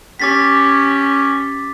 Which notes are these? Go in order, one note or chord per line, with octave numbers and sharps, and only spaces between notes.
C#4 G4 D6 A6 B6